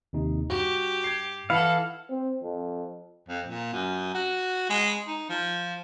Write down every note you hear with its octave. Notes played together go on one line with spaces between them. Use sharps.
D#2 C3 D#4
G2 F#4 G4
G#6 C7
E3 E4 A4 F5 F#5 B5 C#7
C4
F2
F2
A#2
F#2
F#4
G#3
D#4
F3